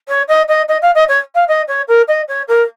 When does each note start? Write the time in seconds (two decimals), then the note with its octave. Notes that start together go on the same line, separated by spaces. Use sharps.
0.08 C#5
0.28 D#5
0.48 D#5
0.68 D#5
0.82 F5
0.95 D#5
1.08 C#5
1.35 F5
1.48 D#5
1.68 C#5
1.88 A#4
2.08 D#5
2.28 C#5
2.48 A#4